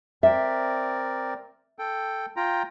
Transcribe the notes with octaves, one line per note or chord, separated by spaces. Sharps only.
C4 A#4 D5 E5
A4 G5
F4 G5 A#5